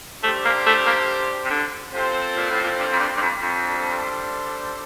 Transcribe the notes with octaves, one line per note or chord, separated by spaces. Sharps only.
G3 A3 D4 G4 C5
A#3
A3
A#3
C3
D3
C3 C4 F4 A4 C5
A#2
A2
A#2
G2
F2
G2
G2
F2
F2
G3 D4 A4 C5